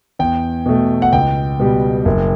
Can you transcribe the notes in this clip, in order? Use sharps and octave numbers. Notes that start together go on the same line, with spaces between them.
E2 G5
B2 A3
F#5
C#2 G5
B2 G3
F#1